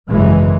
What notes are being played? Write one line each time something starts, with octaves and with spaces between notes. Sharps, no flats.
G#1 F#2 C#3 E3 G#3